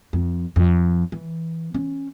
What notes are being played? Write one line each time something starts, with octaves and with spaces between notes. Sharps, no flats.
F2
F2
E3
C#4